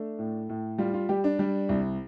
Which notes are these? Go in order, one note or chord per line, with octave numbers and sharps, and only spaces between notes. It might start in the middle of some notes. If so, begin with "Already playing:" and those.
Already playing: A3 D4
A2
A2
G3 F4
F4
G3 G4
D4
G3
C2